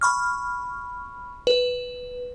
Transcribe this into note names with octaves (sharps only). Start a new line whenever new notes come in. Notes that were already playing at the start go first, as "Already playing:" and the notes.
B5 C#6 F6
B4